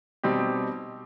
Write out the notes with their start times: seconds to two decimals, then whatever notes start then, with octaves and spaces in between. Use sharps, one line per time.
0.23 B2 G3 C4 D#4 G4